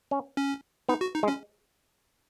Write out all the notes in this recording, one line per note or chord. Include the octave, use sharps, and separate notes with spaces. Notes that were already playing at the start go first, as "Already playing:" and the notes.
C#4
C#4
B3 D#4
F#4
D#4
G#3
C#4